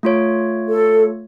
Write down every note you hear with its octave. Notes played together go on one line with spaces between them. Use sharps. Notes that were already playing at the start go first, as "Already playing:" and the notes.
A3 F4 C#5
A4